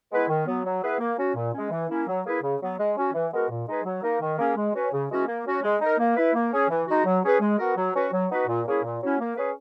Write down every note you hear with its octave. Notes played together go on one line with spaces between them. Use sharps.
G#3 B3 E4 B4
D#3
F#3 B3
F#3
B3 E4 G#4 B4
A#3
C#4 F#4
A#2
G#3 C#4
E3
A#3 C#4 E4
F#3
A#3 E4 G#4 B4
C#3
F#3 B3
G#3
C#4 F#4
E3
G#3 B3 F#4 A#4
A#2
G#3 D#4 G#4 B4
F#3
A#3 D#4 A#4
D#3
A#3 C#4 G#4
G#3
C#4 F#4 B4
C#3
E3 G#3 C#4 F#4
A#3
C#4 F#4
G#3
D#4 A#4
A#3
E4 B4
A#3
C#4 G#4
E3
G#3 D#4 F#4
F#3
C#4 G#4 B4
G#3
B3 F#4 A#4
F#3
C#4 F#4 B4
F#3
B3 D#4 F#4 B4
A#2
A#3 C#4 E4 G#4
A#2
F#3 C#4 E4
A#3
C#4 G#4 B4